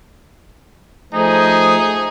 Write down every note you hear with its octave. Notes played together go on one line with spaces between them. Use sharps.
F3 A3 D#4 G#4